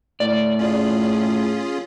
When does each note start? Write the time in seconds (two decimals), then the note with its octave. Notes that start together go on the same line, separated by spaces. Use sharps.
0.20 A2 D5
0.59 C#4 F4 G#4